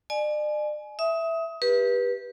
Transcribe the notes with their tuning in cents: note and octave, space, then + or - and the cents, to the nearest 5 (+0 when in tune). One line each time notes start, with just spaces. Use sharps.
D5 +40 G#5 +25
E5 +0 D#6 +25
G4 +10 B4 -20